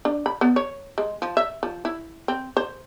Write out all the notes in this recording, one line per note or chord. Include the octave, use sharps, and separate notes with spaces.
D4
B5
B3
C#5
G#3
F3
E5
F3
E4
C4
C5